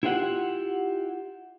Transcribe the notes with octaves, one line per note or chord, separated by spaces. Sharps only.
E4 F4 G4 C5 F#5